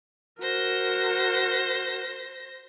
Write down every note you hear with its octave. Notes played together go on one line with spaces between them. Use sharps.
F#4 A#4 C5 A#6